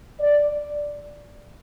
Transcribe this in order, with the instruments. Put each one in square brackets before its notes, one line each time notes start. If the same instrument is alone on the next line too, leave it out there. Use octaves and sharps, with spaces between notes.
[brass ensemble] D5